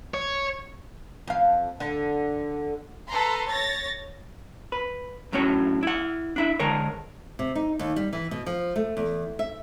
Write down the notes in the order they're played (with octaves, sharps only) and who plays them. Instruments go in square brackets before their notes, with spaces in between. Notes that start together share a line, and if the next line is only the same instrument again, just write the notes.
[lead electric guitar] C#5
[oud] F2 F5
D3
[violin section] A4 B4 A#5 C6
C#5 A6 A#6
[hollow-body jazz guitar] B4
F#2 A2 C#4 F#4 C#5
E4 F#5
D4 E4 E5
D3 G#3 A#4 C#5
[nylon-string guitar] C3
D#4
D#2
G3
E3
B2
F3
A3
E2
E5